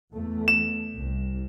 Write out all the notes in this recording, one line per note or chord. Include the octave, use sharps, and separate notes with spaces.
E2 A3
E7
C2